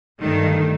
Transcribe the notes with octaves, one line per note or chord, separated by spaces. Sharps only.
G1 G2 D#3 A3